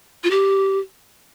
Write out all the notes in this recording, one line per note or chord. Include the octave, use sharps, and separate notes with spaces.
F4
G4